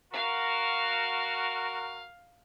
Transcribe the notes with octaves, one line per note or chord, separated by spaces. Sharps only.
F#4 A#4 F5